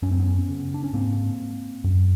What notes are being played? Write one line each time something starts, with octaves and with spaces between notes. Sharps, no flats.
F#2 C#4
C4
B3 C#4
C#3
D4
C#4
G#2 A#3 C4
F#2